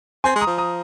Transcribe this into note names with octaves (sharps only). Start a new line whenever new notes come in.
C4 G#5 C6
G#3
A#5 D#6
F3
A#5 D#6